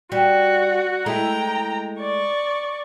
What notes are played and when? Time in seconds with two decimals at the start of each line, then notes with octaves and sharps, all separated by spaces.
0.12 G3 F#4
1.06 G#3 A3 E4 G5 A#5
2.01 D5 C#6